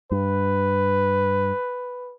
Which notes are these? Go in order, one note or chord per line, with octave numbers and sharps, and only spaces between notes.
G2 B4